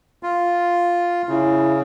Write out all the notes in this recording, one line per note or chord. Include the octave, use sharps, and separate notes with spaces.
F4
C#3 E4